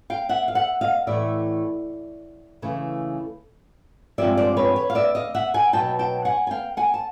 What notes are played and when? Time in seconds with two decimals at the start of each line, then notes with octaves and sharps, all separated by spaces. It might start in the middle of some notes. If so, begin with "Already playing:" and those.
0.10 F5 G5
0.29 E5 F#5
0.48 F5
0.55 E5 F#5
0.81 D#5 F5
1.07 A2 E3 A3 D5 E5
2.62 C#3 E3 A3
4.18 G2 D3 F3 G#3 C4 D5 E5
4.37 C5 D5
4.57 B4 C#5
4.76 B4 C#5
4.90 F5
4.95 D5 E5
5.15 D#5 F5
5.35 E5 F#5
5.54 F#5 G#5
5.73 B2 F#3 B3 D#4 G5 A5
5.99 G5 A5
6.25 F#5 G#5
6.47 G#5
6.51 F5 G5
6.77 F#5 G#5
6.94 A5